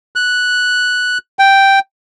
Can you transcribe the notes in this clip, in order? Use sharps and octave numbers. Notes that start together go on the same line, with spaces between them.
F#6
G5